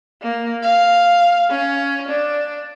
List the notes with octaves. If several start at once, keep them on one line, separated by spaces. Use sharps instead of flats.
A#3
F5
C#4
D4